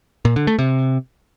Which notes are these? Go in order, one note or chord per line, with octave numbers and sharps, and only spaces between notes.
A#2
D3
A3
C3